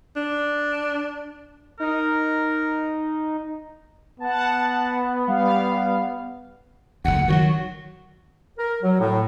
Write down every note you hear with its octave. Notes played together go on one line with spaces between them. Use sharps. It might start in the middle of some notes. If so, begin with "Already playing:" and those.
D4
D#4 A#4
B3 F#5 A5
G3 F5
F#1 D2 F#5
D#3 F3 F#3 F#4
A#4
F#3
A2